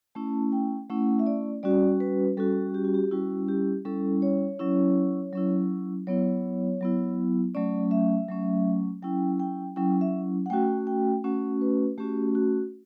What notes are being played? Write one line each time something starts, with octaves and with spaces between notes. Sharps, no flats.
A3 C#4 E4 A5
G5
A3 C#4 E4 F#5
E5
D5
G3 C#4 F#4 D5
B4
G3 C#4 F#4 A4
G4
F#4
G4
G3 C#4 E4 F#4
G4
G3 C#4 E4 A4
C#5
F#3 C#4 E4
F#3 C#4 E4
F#3 B3 E4 C#5
F#3 B3 E4
F#3 A3 C#4 D5
E5
F#3 A3 C#4
F#3 C#4 E4 G5
G5
F#3 C#4 E4 G5
E5
F#5
A3 C#4 F#4 G5
G5
A3 C#4 F#4 F#5
B4
A3 C#4 F#4 G4
F#4